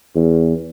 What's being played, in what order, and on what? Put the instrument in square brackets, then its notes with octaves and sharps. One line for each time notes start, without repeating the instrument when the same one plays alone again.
[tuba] E2